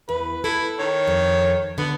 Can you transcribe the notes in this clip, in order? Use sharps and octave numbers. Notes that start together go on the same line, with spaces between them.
E2 B4
E4 A4
D#3 C#5
F2
D3 B3